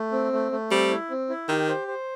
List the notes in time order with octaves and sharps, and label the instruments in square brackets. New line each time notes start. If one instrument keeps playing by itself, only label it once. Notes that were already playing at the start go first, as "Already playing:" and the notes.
Already playing: [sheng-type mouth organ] A3
C4
A3
A3
[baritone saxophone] G3 [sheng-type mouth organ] C4
[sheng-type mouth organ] E4
C4
E4
[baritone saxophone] D#3 [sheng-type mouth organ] G4
[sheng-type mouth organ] C5
C5